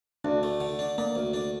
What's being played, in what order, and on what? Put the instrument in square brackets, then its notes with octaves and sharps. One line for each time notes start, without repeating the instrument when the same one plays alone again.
[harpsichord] D2 [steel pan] D4
[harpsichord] A3
D3
D4
[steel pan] A#3 [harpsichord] D4
[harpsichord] D2
D4